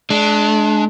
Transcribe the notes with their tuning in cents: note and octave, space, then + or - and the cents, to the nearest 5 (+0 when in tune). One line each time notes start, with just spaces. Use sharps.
G#3 +40 D4 +0